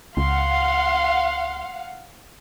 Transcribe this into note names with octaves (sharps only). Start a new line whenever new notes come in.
C#2 F5 F#5 C6